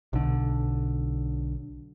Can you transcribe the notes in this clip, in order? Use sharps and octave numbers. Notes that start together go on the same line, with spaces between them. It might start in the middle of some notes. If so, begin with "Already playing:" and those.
B1 D3